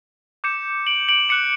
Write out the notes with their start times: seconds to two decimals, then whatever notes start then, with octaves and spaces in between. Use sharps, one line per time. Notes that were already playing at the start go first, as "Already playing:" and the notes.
0.44 D6 G6 C#7 E7
0.87 D7 F#7
1.09 D7 F#7
1.29 D6 F#6 C#7 E7